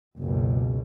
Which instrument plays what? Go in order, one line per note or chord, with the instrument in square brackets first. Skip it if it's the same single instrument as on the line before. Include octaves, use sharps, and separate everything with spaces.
[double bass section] F#1 C#2 B2